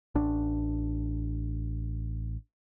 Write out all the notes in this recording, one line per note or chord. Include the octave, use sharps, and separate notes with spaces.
A1 D4